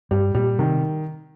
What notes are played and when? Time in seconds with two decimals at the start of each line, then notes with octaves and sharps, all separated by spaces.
0.11 G2 G3
0.35 A#2 G3
0.59 C3 D#3